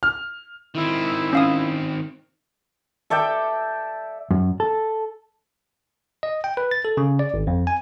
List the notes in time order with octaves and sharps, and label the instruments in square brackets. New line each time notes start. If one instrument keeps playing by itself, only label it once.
[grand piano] F6
[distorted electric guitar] D#3 C4 [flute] E4
[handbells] C#4 F5 D#6
[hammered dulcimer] A4 D5 E5 G5
[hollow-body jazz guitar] F#2
A4
[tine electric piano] D#5
G5
B4
A6
A4
C#3
D5
G#1
F2
G#5